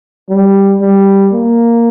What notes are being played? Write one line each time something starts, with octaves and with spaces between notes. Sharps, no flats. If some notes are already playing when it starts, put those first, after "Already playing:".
G3
G3
A#3